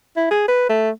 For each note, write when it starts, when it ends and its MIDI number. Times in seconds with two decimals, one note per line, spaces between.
0.16 0.28 64
0.31 0.43 68
0.48 0.68 71
0.69 0.90 57